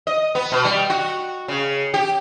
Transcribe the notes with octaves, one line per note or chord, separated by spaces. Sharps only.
D#5
B3
B2
G3
F#4
C#3
G4